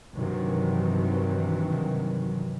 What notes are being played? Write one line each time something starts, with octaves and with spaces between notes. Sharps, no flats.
G2 C3 D#3 E3 F#3